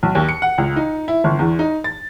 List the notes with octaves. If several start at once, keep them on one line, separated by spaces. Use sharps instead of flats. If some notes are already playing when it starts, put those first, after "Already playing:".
B1
D#2
C#7
F#5
C#2
D#4
E4
G1
E2
D#4
A6